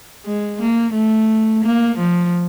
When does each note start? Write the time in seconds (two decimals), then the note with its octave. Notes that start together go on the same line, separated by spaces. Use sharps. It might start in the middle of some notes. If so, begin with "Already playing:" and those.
0.25 G#3
0.60 A#3
0.94 A3
1.63 A#3
1.98 F3